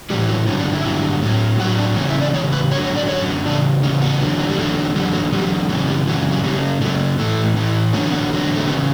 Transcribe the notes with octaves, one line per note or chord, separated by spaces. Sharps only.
A2 E3 G3
F#3
G2 D3 F#3 C#4
D4
E4
G2 D3 F#3
A2 F#3
A2 F#3 F#4
D4
E2 C#3 E3 C#4
E4
D5
E2 C#3 C#5
B4
F#2 D3 F#3 C#5
C#5
D5
F#2 D3 F#3 C#5
E2 C#3 D4
E2 C#3 C#4
B3
E2 D3 F#3
F#3
G3
E2 D3 F#3 A3
E2 D3 F#3 G3
F#3
E2 D3 F#3 G3
F#2 C#3 E3 F#3
G3
F#2 C#3 E3 F#3
F#3
F#2 C#3 F#3 G3
F#2 C#3 F#3 A3
A2 E3 A3
A2 E3
E2 D3 F#3 C#4
B3
E2 D3 F#3
A3
E2 C#3 B3